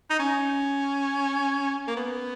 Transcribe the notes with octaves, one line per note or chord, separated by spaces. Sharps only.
D#4
C#4
A#3
B3